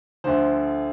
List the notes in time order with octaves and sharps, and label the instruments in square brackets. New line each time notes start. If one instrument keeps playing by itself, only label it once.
[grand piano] D2 D3 F3 C5